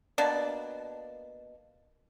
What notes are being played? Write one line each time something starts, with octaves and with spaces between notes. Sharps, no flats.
B2 A#3 D4 D5